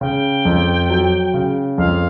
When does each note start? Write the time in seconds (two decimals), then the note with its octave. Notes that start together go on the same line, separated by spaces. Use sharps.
0.01 C#3 G5
0.45 F2
0.89 F#3
1.34 C#3
1.78 F2 F5